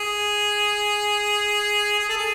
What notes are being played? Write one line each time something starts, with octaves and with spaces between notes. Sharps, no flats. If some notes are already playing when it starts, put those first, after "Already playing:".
Already playing: G#4
G#4
A4
G#4